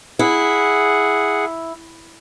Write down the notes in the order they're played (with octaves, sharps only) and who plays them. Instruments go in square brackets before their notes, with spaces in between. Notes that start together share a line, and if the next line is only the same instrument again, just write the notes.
[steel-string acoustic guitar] E4 [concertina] G#4 F#5